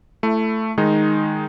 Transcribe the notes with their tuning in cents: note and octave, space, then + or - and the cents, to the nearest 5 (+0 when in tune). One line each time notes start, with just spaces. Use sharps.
A3 +0 E4 +25
D#3 -5 G#3 +0 D#4 +0